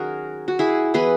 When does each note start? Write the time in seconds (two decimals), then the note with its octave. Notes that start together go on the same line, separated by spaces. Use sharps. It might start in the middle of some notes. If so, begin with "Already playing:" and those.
Already playing: D#3 F#3 C#4 F#4 G#4 A#4
0.48 F#4
0.59 E4 G#4
0.94 E3 B3 G#4 B4